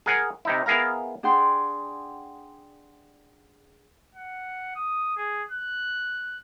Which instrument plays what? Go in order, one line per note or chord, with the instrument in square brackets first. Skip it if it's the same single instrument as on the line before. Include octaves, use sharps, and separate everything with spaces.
[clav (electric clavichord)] G#4 A#4 F#5 G#5
C3 D#4 E4
B3 E4 G#4 A#4 F5 A#5
[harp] D4 G#4 F#5 G5 C6
[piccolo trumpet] F#5
D#6
G#4
F#6